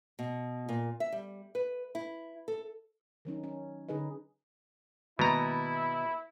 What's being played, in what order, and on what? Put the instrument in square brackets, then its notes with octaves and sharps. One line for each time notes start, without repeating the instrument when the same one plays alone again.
[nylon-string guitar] B2
A#2
E5
G3
B4
E4
A4
[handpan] D#3 F#3 C#4 D#4
C#4
D3 D#4 G#4 B4 D#5
[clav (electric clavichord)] B2 A#5 [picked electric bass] D#3 G#3 A#3 [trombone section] E4